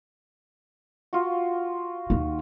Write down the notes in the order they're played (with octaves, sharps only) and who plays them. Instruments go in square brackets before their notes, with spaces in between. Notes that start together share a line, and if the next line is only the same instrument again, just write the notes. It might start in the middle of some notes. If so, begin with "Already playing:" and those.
[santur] F4 F#4
[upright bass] D#2 D#3